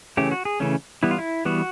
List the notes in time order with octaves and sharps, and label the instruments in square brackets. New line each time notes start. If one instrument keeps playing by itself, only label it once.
[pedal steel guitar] C#3 E3 A3 C#4 G4
F#4
G#4
C#3 E3 A3 C#4
E3 G3 B3 E4
F4
E4
E3 G3 B3 F#4